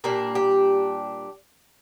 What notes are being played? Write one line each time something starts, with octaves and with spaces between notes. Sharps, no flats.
A#2 G3 A#3 D4 A#4
G4